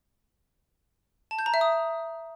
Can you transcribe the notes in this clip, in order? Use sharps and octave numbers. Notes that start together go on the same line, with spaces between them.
A5
G6
A#5
E5
D#6